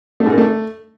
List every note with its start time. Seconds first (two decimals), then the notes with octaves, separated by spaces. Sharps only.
0.20 A3
0.26 G#2
0.32 A#3
0.38 A3